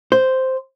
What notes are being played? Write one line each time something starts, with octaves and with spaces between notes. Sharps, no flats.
C5